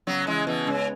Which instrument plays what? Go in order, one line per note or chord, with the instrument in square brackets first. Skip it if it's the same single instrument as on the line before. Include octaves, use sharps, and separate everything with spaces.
[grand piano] C#3 [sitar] F#3 B3
[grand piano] C#3 [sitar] E3 G#3
[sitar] B2 E3 [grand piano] B3
[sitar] C#3 [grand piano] G#3